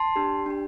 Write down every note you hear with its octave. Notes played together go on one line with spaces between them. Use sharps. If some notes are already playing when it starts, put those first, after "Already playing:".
Already playing: A5 C6
D4 G4
D4 G4